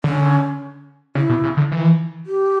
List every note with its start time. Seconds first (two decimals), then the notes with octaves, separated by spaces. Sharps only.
0.04 D3 C#4
1.15 C#3 E4
1.29 B2
1.43 C#3
1.57 D3
1.72 E3
2.26 G4